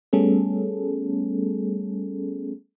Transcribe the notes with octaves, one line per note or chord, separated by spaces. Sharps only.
G3 A3 B3 C#4 G#4 A4